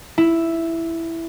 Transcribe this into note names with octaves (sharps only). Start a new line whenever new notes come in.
E4